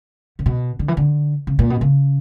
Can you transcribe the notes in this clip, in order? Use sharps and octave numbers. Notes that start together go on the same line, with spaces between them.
C#3
B2
D3
E3
D3
C#3
A#2
B2
C#3